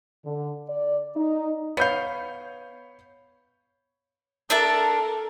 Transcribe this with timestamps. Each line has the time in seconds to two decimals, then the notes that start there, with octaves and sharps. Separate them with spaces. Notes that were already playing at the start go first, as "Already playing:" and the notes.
0.25 D3
0.69 D5
1.16 D#4
1.77 B3 C#5 F5 B5 G6
4.50 D4 A4 A#4 E5 A5